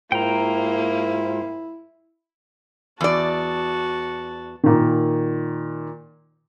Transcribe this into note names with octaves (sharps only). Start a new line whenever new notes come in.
G#2 A#3 E4 F4 C5 G5 A#5
E2 F#4 D5 A5
A#2 D#3